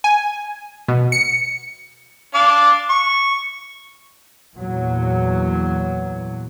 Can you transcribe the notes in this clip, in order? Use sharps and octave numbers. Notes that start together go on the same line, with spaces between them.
G#5
B2
C#7
D4 F5 D6
C#6
E2 A#2 F#3